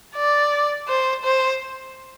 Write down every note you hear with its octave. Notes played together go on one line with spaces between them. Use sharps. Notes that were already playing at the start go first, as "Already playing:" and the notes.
D5
C5
C5